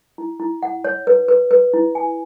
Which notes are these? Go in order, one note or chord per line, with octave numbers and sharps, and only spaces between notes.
E4
E4
F#5
C#5
B4
B4
B4
E4
G#5